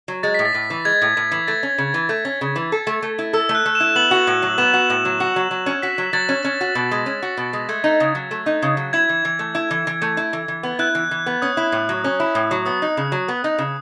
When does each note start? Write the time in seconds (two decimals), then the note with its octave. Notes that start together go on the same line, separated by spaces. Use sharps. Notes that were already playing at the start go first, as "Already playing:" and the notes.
0.08 F#3
0.23 G#3 A6
0.34 A2 B6
0.45 A6
0.54 A2
0.70 E3
0.85 G#3 G#6
1.02 A2
1.17 A2
1.32 E3
1.48 A3 A6
1.63 C#4
1.78 C#3
1.94 E3
2.09 A3 G#6
2.25 C#4
2.41 C#3
2.56 E3
2.72 A4
2.87 A3
3.02 A3
3.19 E4
3.33 A4 E6
3.49 A3
3.55 F#6
3.66 A3
3.75 E7
3.80 E4
3.95 B3 F#7
4.11 F#4
4.27 A2
4.42 F#3
4.58 B3 E7
4.73 F#4
4.90 A2
5.05 F#3
5.20 F#4
5.36 F#3
5.51 F#3
5.66 C#4
5.83 F#4 B6
5.98 F#3
6.13 F#3 A6
6.29 C#4
6.44 C#4
6.61 F#4
6.75 B2
6.91 G#3
7.06 C#4
7.22 F#4
7.37 B2
7.53 G#3
7.69 A3 G#6
7.84 D#4
8.00 C#3
8.15 F#3
8.31 A3
8.46 D#4
8.62 C#3
8.77 F#3
8.93 E4 G#6
9.09 E3
9.25 E3
9.39 A3
9.55 E4
9.71 E3
9.87 E3
10.02 A3
10.17 E4
10.33 E3
10.48 E3
10.63 B3
10.79 E4 F#6
10.95 E3
11.11 E3
11.26 B3
11.42 C#4 D#6
11.57 E4
11.72 A2
11.89 F#3
12.04 C#4
12.20 E4
12.35 A2
12.51 F#3
12.66 B3 D#6
12.82 D#4
12.97 C#3
13.12 F#3
13.28 B3
13.44 D#4
13.58 C#3